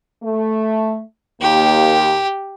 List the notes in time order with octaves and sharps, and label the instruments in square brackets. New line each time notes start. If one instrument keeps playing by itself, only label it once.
[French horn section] A3
[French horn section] D#2 A#3 [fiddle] G4